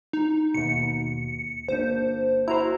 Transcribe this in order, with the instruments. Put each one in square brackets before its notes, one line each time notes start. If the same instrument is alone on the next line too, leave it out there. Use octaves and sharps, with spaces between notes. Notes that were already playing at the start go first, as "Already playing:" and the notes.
[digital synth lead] D#4
[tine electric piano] D#2 B2 [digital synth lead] C#7
[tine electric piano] G1 A#3 D4 [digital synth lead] C5
[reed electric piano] E4 F#4 C5 [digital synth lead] A#5